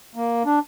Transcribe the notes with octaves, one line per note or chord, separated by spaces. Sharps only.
A#3
D4